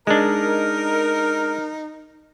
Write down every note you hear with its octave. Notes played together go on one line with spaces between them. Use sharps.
G#3 D4 D#4 A#4